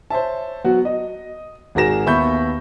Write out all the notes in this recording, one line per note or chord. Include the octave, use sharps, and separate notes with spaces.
C5 C#5 E5 A5
F#3 B3 F#4
D#5
G#1 F#4 G#4 A#4 A#6 E7
D#2 B3 E5 B5 C#6 G6